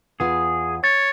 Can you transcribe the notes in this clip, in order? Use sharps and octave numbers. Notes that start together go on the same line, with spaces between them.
E2 B3 F4 G#4
C#5 A6